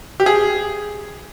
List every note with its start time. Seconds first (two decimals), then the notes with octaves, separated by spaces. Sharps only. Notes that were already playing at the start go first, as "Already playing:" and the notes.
0.20 G4
0.26 G#4